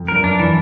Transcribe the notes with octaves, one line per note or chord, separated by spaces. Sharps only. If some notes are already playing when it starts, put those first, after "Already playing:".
Already playing: F2
G2 A#4
F#2
D4
E3